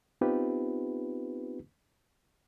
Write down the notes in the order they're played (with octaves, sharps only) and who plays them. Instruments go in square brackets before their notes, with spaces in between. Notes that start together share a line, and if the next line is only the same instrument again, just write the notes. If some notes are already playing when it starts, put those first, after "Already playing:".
[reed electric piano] B3 C4 D#4 F4 G4 B4